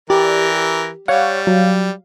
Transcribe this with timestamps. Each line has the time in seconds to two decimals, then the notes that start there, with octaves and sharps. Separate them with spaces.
0.10 E3 G4 A#4 D5
1.08 G3 C#5 F5 F#5
1.47 F#3